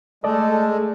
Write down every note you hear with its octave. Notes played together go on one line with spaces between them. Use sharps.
G#3 A3 A4 D5 D#5